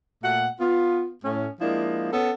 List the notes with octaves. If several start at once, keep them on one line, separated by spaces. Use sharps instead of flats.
A#2 A3 F#5
B3 F4
A2 C#4
F3 G#3 A#3 D4 E4
B3 C#4 A4